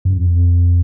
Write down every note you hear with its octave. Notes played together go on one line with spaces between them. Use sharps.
F#2
F2